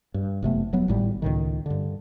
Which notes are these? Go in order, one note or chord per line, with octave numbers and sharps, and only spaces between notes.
G2
F#1 C3 A3 B3
D#1 F#3 B3
G#1 A2 G3
C#2 A2 D#3
G2 D3